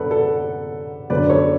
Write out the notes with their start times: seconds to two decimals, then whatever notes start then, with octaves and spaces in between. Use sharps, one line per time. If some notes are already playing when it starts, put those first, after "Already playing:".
Already playing: F#2 D3 A4 B4 D5 F#5
0.11 A4
1.10 F#2 D3 B4 D5
1.30 A4 C#5